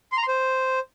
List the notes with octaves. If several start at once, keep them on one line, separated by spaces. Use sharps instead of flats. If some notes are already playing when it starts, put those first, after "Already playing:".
C6
A#5
C6
C5